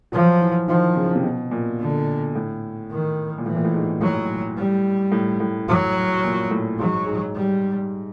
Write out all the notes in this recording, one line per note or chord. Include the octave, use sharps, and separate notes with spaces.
F3 F#3
E3
D#3 F3
C#3
C3
B2
A#2
D3
A2
D#3
A#2
A2 E3
A#2
A2
G#2
A2 F#3
G3
A2
A2
F#3
A#2
A2
G#2 F#3
G#2
G3